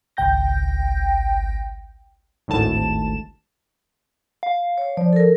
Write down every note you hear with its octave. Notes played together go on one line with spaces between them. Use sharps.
G#1 C#2 G5 G6 A#6
G#1 D2 A2 A5 E7
F5
C#5
F3 D5
A4 A#4